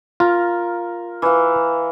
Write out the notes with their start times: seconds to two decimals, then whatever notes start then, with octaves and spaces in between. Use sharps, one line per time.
0.20 F4 A#4
1.22 E3 F5